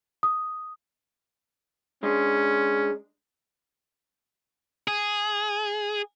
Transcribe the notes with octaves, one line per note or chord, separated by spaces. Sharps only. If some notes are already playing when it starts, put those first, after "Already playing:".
D#6
G#3 C#4 D4
G#4